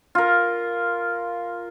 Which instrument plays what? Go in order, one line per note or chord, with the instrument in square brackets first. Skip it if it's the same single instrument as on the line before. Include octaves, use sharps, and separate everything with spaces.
[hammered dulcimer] F4 A#4